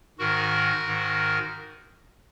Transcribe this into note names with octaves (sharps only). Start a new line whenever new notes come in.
G#2 D#3 F#4 A#4
G#2 D#3